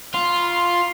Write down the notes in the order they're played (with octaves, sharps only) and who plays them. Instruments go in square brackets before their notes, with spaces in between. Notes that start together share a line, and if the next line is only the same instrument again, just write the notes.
[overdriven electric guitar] F4 [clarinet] C6